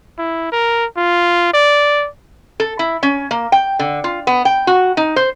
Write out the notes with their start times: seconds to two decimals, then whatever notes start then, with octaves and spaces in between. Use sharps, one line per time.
0.19 E4
0.52 A#4
0.97 F4
1.54 D5
2.60 A4
2.79 E4
3.03 C#4
3.31 A#3
3.52 G5
3.79 D3
4.04 F4
4.27 B3
4.45 G5
4.67 F#4
4.97 D#4
5.16 C5